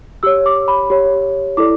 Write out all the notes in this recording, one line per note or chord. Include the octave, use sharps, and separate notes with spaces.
G4 C#5 E6
D6
B5
G4 C#5
E4 A4 D5 D6